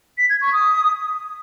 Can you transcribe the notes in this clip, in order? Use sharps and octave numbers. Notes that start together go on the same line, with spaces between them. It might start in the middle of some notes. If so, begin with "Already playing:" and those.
B6
G#6
C#6
D#6